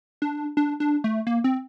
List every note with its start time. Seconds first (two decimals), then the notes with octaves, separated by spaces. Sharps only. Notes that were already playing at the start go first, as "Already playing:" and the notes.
0.22 D4
0.57 D4
0.80 D4
1.04 A3
1.27 A#3
1.44 C4